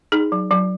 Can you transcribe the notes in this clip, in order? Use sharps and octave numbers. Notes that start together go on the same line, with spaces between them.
D#4 G#4
F#3
F#3